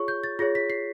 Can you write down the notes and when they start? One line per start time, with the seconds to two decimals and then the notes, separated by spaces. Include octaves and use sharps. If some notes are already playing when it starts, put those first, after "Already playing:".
Already playing: F4 G#4 C#5 C#6
0.08 G6
0.24 A6
0.39 F4 G#4 C#5 A#6
0.55 B6
0.70 C7